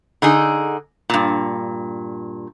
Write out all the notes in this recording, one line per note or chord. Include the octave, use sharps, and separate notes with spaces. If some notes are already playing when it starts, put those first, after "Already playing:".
D3 D#4 G#4
G2 A#2